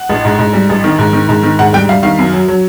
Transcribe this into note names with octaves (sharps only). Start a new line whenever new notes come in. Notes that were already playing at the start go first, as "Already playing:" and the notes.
Already playing: F#5
A1
G#2
G#2
G3
A1
D#3
G#2
D#3
G#2
D#3
G#2 F#5
G3 G5
G3 F5
D#3 F5
F#2
F#3
F#3